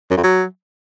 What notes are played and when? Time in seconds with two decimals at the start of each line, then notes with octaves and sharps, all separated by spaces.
0.11 F#2
0.17 F2
0.24 F#3